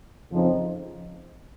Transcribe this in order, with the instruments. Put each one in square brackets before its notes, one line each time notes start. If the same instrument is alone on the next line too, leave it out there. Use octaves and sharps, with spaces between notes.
[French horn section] F2 C#3 F3 C4 D#4